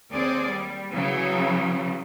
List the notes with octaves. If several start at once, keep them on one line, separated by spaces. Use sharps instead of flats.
D#2 C4 G#4 D5
G3
C#3 E3 F#3 G3